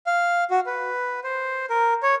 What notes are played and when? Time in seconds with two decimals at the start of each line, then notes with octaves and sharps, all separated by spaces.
0.07 F5
0.51 F#4
0.66 B4
1.24 C5
1.70 A#4
2.03 C#5